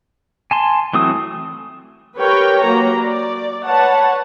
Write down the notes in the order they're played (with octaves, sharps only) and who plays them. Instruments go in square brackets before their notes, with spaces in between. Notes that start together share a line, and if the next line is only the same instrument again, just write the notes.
[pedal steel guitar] G#5 A5 C6
E3 F#3 A3 C4 D#6
[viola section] G4 A#4 B4 C#5 G5
F#3 A#3 A#5
D5
B4 C#5 F#5 A5